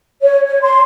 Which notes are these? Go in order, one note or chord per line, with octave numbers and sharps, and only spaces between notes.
C#5
C#5
C6